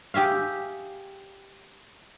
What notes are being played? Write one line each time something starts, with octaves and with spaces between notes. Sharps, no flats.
G4 G#4 E5 F5